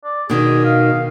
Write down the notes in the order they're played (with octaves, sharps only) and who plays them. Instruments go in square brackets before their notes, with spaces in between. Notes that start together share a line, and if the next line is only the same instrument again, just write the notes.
[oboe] D5
[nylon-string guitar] B2 D#3 [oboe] G#4
[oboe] F5